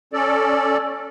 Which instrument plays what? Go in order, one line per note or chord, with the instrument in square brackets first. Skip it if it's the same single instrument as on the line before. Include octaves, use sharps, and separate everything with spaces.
[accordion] C#4 A4 D5